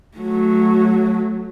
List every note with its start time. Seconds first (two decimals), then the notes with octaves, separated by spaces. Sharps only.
0.18 F#3 A3